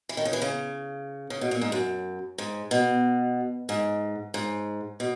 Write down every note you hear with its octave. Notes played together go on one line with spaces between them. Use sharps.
E3
D#3
C#3
E3
C#3
C#3
B2
A#2
G#2
F#2
G#2
B2
G#2
G#2
B2